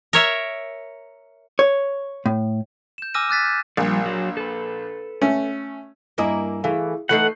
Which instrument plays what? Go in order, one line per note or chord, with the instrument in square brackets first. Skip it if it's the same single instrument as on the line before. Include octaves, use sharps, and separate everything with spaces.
[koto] A#4 C#5 E5
[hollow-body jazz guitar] C#5
A2
[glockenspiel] G6 E7
G#5 D6 E6 F6 A#6 D#7
D6 F#6 A6 B6
G6
[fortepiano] A#1 [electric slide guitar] F3 G3
[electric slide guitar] F#3
A4 B4
[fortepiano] A3 C#4
[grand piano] G2 G#5 A#5 [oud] A#3 E4 D#5
[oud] E3 A3 [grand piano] E4 G#4 F5
[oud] E3 A3 D#4 [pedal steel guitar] F#5 [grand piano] F#6 G6 C7